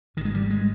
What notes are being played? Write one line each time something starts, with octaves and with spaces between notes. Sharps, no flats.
G#1 D#3
G#3
G3
G#3